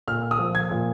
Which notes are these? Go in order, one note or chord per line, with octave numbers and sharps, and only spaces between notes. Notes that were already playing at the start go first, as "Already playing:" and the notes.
A#2 F6
D#6
F3
G#6
A#2